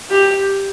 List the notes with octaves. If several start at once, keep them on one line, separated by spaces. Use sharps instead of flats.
G4